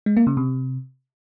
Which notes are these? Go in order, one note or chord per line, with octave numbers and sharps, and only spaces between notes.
G#3
A#3
C#3
C3